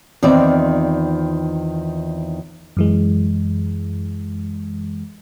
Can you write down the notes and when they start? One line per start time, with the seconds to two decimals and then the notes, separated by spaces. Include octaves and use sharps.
0.23 E2 D#3 C4 F4 D5
2.77 F#2 E3 G#3